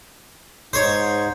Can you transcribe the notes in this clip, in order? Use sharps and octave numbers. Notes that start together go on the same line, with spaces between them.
G#2 D#4 C5 C#5